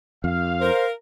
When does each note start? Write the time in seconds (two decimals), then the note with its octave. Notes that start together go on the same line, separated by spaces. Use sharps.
0.24 F2 F5
0.61 A#4 C5